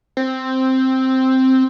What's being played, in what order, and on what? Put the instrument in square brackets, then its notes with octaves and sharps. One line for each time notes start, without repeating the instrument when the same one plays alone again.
[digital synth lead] C4